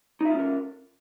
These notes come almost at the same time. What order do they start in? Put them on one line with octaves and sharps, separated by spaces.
D#4 E5 F4 C#4 A#4